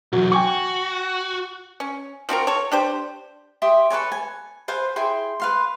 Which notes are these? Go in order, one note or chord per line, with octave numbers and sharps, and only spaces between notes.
B1 E2 F#3
F#4 G5 G#5 C#6
C#4
F3 C4 F#4 A#4
A4 C#5
D4 G4 C5
G4 E5 C6 D#6
A4 B4 C#5 G#5
G#5
B4 C5 F5 G#5
E4 G#4 G5 C6
B4 F5 C6